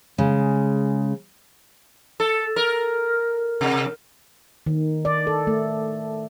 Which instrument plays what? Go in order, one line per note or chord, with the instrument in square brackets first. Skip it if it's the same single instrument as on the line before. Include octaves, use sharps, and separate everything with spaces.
[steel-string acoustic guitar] C#3 G#3
[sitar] A4
A#4
C3
[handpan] D#3
D5
A4
A3